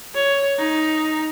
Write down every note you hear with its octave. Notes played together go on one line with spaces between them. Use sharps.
C#5
D#4